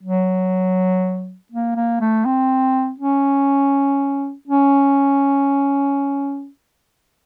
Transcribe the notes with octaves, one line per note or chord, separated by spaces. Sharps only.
F#3
A#3
A#3
A3
C4
C#4
C#4